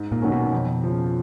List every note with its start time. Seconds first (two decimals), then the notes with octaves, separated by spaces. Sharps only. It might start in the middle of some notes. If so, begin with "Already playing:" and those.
Already playing: G#2
0.12 A#2
0.22 D#3 F#3 A#3 C#4
0.32 B2
0.53 F2
0.83 C#3 F3